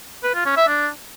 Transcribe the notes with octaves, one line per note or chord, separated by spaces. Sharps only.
B4
F4
C#4
E5
D4